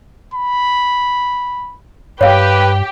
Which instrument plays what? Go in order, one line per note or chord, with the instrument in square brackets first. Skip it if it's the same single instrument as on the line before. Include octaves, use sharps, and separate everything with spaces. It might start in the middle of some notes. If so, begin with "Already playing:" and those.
[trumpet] B5
[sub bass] G2 [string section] G4 [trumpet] B4 [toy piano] C#5 F5